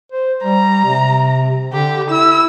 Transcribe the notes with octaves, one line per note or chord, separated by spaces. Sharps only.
C5
G3 A#5
C3
D3 G4
E4 E6